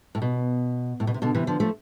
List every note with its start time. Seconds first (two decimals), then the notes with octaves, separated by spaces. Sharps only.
0.15 A2
0.22 B2
1.00 A2
1.07 B2
1.14 C3
1.22 B2 D3
1.35 C3 E3
1.47 D3 F3
1.60 F3 A3